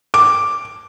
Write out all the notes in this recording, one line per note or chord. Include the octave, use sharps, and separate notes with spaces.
D6